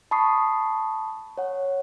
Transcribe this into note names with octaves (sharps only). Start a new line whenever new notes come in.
A5 B5 C#6 D#6 C7
C#5 F#5